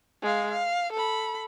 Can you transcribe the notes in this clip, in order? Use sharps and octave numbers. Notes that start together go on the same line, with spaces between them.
G#3 F5
F5
A4 B5